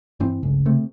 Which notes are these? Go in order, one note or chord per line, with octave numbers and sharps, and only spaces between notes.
G2 E3 C4
D1 G1 C#2 C#3
C3 A3